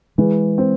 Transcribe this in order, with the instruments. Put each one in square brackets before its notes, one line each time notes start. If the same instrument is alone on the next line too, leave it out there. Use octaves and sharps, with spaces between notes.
[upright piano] E3 [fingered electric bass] G#3
[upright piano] C4